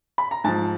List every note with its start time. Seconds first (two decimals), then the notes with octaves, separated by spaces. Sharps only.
0.18 B5
0.31 A#5
0.44 G#2 F3 A5